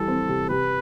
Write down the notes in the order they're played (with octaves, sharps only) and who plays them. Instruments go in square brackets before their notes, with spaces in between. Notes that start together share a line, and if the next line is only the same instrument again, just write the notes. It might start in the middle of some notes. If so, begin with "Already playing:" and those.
Already playing: [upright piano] E3 G3 [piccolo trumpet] A4
[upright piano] C4
C3
[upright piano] C3 [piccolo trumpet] B4